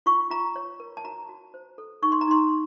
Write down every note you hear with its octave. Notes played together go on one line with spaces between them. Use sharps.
F4 C#6
F4 A#5
C#5
A#4
A5
F#4 A#5
F#4
C5
A4
D#4 C#6
C6
A#5
D#4 C6